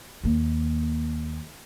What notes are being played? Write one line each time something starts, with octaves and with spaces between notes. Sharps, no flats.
D#2 A#3